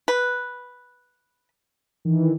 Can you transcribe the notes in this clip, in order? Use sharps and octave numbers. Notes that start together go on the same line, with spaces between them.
B4
D#3 E3